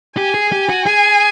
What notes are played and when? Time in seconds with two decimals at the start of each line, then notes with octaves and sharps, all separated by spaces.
0.17 G4 G#5
0.34 G#4
0.52 G4
0.69 F#4
0.86 G#4 G#5